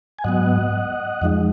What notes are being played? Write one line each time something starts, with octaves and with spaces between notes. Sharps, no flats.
G#5
G#2 F#3 B3 D#5 F#5
F2 F3 G#3 D#4